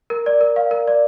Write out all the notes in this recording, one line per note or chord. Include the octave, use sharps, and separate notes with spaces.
A#4
D5
A#4
F5
A#4
D5